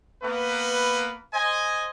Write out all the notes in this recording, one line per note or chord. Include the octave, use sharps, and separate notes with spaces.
A#3 B3 B4
C5 D#5 G#5